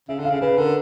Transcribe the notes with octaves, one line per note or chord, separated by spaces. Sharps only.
C#3 E5
D3
F5
C#3
C#3 B4
D3 A#4